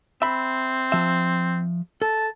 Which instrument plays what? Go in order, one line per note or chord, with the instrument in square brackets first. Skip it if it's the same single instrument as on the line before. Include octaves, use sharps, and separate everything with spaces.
[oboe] C4 [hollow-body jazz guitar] E5 B5
[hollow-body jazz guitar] F3 E5
[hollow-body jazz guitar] A4 [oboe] A5